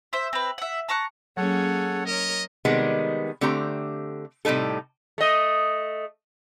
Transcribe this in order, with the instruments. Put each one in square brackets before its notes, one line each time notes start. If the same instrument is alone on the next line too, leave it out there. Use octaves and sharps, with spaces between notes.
[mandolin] C5 E5
C4 B4
E5 F#5
A5 A#5 C#6 F#6
[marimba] F#3 [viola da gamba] A#3 C#4 G#4 [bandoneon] A4 C#5 F#5
[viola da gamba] A#4 C#5 [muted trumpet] D#5
[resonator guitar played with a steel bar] C3 D#3 G3 G#3 B3
D3 A3 C4 G4 A#5
A2 C3 G3 D#4 A4
[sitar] A3 D#5